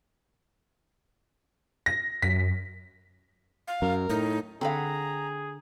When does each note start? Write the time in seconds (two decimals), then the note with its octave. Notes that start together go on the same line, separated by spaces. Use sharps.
1.86 A#6
2.22 F#2 B6
3.68 F5
3.82 F#2 A#4
4.10 A2 D#4
4.61 D3 C4 G#4 F5 F#5 A#5 B5